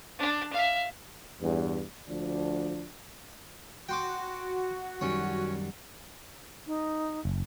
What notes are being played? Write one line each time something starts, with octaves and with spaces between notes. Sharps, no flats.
D4
E5 F5
E2 G2
D2 F3 D4
F#4 G5 C6 D6
F#2 D#3 G3 C#4 C#5
D#4
F#1